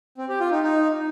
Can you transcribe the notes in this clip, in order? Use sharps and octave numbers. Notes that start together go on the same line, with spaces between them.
C4
G4
F4
D#4
D#4